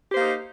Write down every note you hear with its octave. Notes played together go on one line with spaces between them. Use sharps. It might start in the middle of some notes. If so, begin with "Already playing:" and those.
A#3 D#4 G4 C5